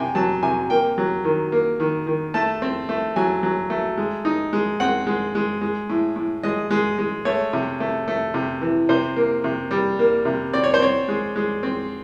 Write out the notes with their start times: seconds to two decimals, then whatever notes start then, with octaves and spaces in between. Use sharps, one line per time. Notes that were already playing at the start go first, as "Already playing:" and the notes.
Already playing: C3 G5 G#5
0.15 F#3 A5
0.43 C3 G#5
0.70 A#3 G5
0.98 F#3
1.24 D#3
1.52 A#3
1.80 D#3
2.07 D#3
2.34 A3 A5
2.62 C4
2.89 A3
3.16 F#3 G#5
3.43 F#3
3.70 A3
3.97 G#3
4.25 D#4
4.53 G#3
4.80 C4 F#5
5.07 G#3
5.35 G#3
5.61 G#3
5.90 A2
6.16 A2
6.43 G#3 D#5
6.71 G#3
6.99 G#3
7.25 A3 C#5
7.53 C3
7.80 A3
8.08 A3
8.34 C3
8.62 E3
8.89 C3 C5
9.16 A#3
9.44 C3
9.71 G3
9.99 A#3
10.25 C3
10.53 C4 D5
10.64 C#5
10.74 C5
10.80 C4 C#5
11.08 G#3
11.36 G#3
11.63 C4